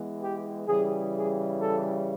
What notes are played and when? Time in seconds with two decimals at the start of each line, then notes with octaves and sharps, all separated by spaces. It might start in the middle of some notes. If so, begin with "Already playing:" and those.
Already playing: E3 G#3 B3
0.20 G4
0.67 C#3 E3 G3 G#4
1.15 G#4
1.61 A4